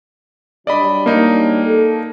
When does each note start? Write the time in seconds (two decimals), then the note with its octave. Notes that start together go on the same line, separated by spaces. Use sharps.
0.67 F#3 G3 D4 D5 D#5 B5
1.06 A#3 D#4
1.64 A4